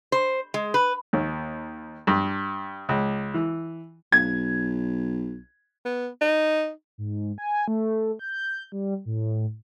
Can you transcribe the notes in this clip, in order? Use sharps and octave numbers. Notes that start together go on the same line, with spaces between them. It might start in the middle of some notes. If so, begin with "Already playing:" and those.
C5
G#3
B4
D#2
G2
C#2
E3
B1 G#6
B3
D#4
G#2
G#5
A3
G6
G3
A2